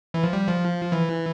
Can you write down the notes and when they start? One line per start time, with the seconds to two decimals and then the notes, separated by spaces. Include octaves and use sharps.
0.14 E3
0.24 F3
0.33 G3
0.48 F3
0.92 E3